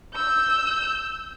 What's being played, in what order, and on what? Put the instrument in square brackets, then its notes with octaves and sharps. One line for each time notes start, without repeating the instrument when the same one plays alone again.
[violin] E6 G6